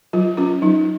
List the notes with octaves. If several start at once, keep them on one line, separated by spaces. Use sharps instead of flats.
F#3 F4
C#4 F4
F#3 D#4